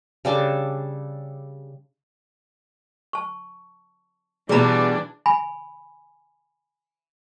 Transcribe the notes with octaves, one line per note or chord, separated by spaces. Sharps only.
C#3 G3 D4 A4
A5 C#6
B2 E3 G3 D4 G#4 A#5 B5
G#5 B5